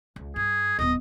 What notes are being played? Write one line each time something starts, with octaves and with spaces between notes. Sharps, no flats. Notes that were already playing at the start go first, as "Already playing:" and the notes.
C#2
G2 G#4
D1 B3 D#5